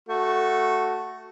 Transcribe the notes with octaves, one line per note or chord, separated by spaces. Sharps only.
A3 F#4